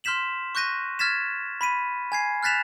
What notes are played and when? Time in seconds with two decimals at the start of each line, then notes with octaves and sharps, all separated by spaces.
0.04 C6 F6 G6 B6 E7 F#7
0.55 C#6 F#6 G6 A#6 D#7
0.99 F6 G#6 A6 B6 E7
1.61 B5 B6 D#7
2.12 G#5 G#6 C7
2.43 F6 F#6 A6 B6 E7 F7